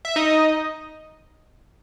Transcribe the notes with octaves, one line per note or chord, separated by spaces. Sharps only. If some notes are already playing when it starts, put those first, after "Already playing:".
E5
D#4 D#5